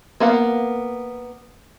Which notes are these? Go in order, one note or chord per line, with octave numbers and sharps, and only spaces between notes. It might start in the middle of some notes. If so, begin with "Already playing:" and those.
A#3 B3 F5 F#5